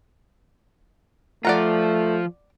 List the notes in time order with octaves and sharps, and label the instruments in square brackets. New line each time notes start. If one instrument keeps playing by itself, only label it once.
[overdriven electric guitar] F3 F4 [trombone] A3 [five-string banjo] D5 F#5 A#5